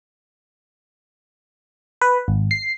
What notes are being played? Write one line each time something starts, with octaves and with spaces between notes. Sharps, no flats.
B4
G#1
C7